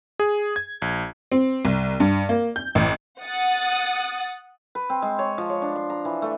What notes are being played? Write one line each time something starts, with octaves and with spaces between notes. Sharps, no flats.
G#4
G#6
A#1
C4
C2
G2
A#3
G6
A1
F#5 D#6 A6
B4
C4
G#3
C#5
F3
C#5
D4
C6
A#5
E3
A3